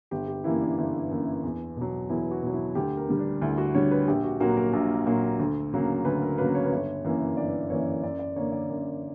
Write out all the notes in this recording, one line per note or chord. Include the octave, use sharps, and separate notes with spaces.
G1 G4
G4
F#2 E3 A#3 E4
D4
G1
F#2 E3 A#3
E2
B2 F#3
E2 E4
F#4
B2 F#3
E4
D2 G4
A#4
D3 G3
D4
D2 E4
F#4
D3 G3 C#5
B4
A#1 G4
F#4
A#2 F#3 A#3 F#4
A#4
A#1
A#2 F#3 A#3
D2
C#3 F#3 A#3
D2 B4
A#4
C#3 F#3 A#3 B4
C#5
B4
G1
C#5
F#2 E3 A#3
G1 D5
F#2 E3 A#3 C#5
F#2 D5
D5
D3 A#3 C#5
D5
F#2